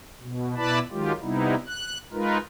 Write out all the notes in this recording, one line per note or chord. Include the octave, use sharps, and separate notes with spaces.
B2
B2 E4 B4 D5 A5 B5
D#3 F#3 G#3 F4 G4
C3 G3 B3 D#4 E4
F#6
G#3 D#4 F4 A#4 B4